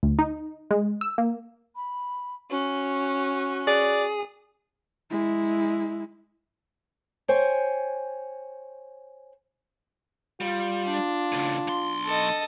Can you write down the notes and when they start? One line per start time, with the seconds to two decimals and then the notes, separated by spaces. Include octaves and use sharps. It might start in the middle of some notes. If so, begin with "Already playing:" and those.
0.03 D2
0.19 D#4
0.71 G#3
1.01 E6
1.18 A#3
1.76 B5
2.51 C#4 F#4
3.67 G#4 D5
5.11 G#3 E4
7.28 C5 C#5 G5 G#5
10.41 G3 F4
10.84 D4
11.32 A2 C#3
11.67 B1 C6
12.05 A4 D#5